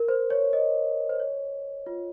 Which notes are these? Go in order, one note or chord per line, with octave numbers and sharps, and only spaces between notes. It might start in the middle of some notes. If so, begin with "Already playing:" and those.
Already playing: A#4
C5
C#5
D#5
C5
C#5
F4